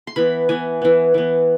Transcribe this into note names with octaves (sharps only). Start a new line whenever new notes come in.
C6
E3 B3 B5
E3 B3 G#5
E3 B3
E3 B3